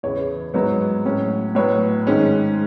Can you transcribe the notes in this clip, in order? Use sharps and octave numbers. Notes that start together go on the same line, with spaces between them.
E2 C#3 E3 C#5
G#2 F#3 B3 C#5
A2 F#3 C#4
A2 F#3 B3 C#5
G#2 D#3 G#3 C#4